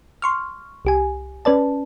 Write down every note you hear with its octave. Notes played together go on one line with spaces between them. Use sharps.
C6 C#6 F6
C2 G4 G#5
C#4 B4 D5 A5